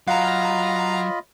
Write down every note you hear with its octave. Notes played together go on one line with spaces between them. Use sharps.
F#3 F4 D#5 F5 F#5 A#5 B5